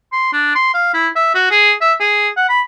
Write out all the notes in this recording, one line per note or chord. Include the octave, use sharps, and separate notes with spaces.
C6
D4
C6
F5
E4
E5
F#4
G#4
E5
G#4
F#5
B5